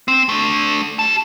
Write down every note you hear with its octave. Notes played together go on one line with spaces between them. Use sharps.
C4
A3 D4
G4 A5